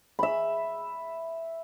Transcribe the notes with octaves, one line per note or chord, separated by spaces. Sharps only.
E5 B5